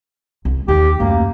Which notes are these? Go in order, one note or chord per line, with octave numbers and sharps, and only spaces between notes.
C2
D#2 G4
F#2 A3 A#3